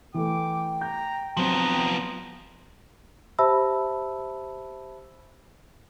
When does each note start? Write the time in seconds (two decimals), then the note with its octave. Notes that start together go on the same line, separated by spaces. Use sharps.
0.14 E3 A3 G5 D6
0.81 A#5 G6
1.37 F3 F#3 B3 C4 A#5
3.39 G4 C5 E5 A5 B5 E6